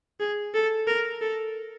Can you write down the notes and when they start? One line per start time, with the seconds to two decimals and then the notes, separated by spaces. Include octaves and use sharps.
0.20 G#4
0.54 A4
0.87 A#4
1.22 A4